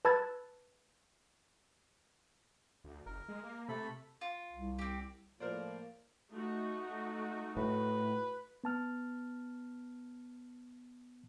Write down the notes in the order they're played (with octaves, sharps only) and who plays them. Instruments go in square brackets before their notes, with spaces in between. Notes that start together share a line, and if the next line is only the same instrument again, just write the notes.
[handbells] B4 A5 B5 E6 G#6 A6
[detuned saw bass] D2
[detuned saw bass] F#1 [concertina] A#4
[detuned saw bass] G#3
A#3
[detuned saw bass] C3 [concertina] A3 A4 B5
[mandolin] F4
[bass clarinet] C2
[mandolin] C4 G4
[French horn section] A2 F3 A#3 [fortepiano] A#4 C5 D5
[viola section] A3 D#4 F#4
[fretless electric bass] A2 [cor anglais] B4
[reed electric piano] B3 A5 F6